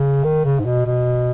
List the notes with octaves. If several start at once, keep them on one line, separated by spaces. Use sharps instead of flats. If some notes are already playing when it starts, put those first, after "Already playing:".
Already playing: C#3
D#3
C#3
G#2
B2
B2